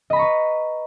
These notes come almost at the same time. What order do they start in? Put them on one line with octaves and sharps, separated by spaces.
D#5 B5 A#5 C#6 B4